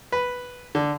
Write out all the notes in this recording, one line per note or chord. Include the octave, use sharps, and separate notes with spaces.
B4
D3